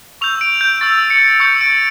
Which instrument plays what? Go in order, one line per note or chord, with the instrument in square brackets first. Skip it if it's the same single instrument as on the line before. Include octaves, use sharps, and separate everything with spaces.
[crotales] C#6 E6 G6 F7
D7
G6
C#6 E6 G6 A6
C#7
C#6 E6 G6 C#7
D7